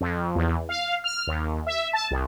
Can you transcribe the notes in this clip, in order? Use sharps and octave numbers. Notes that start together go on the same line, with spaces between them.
F2
E2
F5
F6
D#2
E5
A5
C2